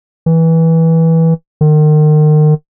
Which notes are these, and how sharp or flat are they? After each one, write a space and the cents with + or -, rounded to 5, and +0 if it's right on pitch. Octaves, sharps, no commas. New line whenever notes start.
E3 -15
D#3 -35